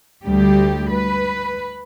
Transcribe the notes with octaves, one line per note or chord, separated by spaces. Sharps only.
D2 G3 G4
B4